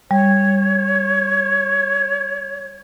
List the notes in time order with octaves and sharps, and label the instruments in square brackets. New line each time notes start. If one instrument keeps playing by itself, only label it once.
[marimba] G3 [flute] C#5